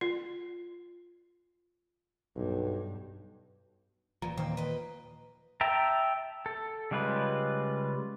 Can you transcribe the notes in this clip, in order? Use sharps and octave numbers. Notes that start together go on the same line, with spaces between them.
F4
B1 G2
D#1 A#2 E3 F3 A#5
A#2 D#3 A#3 C4
B4 D#5
E5 G5 A5 A#5
A4
C#3 G3 G#3 F4 B4